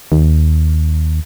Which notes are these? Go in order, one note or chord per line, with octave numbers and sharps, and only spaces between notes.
D#2